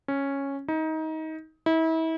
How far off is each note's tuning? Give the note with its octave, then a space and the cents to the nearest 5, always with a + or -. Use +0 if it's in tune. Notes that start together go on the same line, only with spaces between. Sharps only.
C#4 -5
D#4 +25
E4 -35